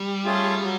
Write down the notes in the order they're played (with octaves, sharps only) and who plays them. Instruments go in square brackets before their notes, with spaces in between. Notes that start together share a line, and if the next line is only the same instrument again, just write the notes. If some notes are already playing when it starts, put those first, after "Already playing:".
Already playing: [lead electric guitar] G3
[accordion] A3 C#4 F4 G#4
F#3